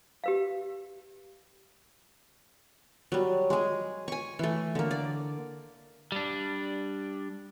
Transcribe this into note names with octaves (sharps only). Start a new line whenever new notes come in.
G4 B4 F5
F#3 G3
G#3 G#4
G#5 C#6
E3 A3
D3 A#3
D5
G3 D4